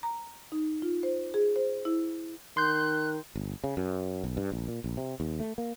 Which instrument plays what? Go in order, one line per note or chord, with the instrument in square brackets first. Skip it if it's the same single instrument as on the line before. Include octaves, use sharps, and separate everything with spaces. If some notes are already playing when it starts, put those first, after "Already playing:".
[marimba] A#5
D#4
F4
C5
G#4
C5
E4
[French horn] D#3 [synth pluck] C6 G6 [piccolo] F#6
[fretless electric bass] G1
C#3
F#2
B1
G2
A#1
A#2
A#1
C3
D#2
A3
A#3